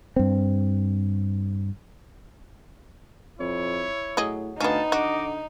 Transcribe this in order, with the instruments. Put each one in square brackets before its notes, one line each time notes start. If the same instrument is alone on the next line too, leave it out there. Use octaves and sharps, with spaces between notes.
[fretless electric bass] G2 C4
[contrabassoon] F2 [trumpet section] E4 C#5
[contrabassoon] A2 [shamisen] F#3 G#4 D#5
[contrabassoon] D2 [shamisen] B3 C#4 [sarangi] D#4 [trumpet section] F5 A5
[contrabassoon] D3 [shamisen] F#4 [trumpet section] D#5 D6